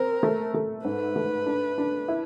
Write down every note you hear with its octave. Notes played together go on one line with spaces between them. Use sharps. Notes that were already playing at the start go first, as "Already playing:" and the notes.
Already playing: C4 A#4
A3
A3
G#2 B4
A3
D4
D4
E4